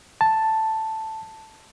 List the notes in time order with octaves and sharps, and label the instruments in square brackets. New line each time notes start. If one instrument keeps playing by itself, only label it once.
[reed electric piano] A5